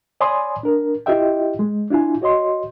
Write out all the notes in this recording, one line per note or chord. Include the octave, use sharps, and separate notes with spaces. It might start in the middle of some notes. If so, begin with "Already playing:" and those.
C#5 D5 G#5 B5 C6 D#6
D4 A#4
E4 F4 G4 D#5 E5 G5
G#3
D4 E4 F4 G#5
F#4 C#5 D#5 C6